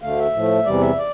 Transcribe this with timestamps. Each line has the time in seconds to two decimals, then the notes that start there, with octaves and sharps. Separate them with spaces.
0.02 D2 D3 A3 F5
0.18 E5
0.34 A2 F3 A3
0.65 E2 C3 E3 G3 D5
0.81 E5
0.98 D5